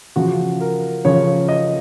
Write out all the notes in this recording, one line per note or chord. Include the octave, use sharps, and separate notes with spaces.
C#3 F3 F#4
A#4
C#3 F3 C#5
D#5